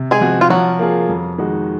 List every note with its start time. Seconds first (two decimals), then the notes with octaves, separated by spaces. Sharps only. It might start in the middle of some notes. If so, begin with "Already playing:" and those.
Already playing: C3
0.11 G#3 G#4
0.21 F3 C4 F#4
0.41 F4
0.50 F3 F#3 F#4
0.79 A#3 F4 G#4
1.09 F2
1.38 D#3 G#3 D#4 F#4